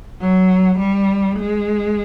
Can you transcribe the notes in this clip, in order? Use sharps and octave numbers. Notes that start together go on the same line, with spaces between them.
F#3
G3
G#3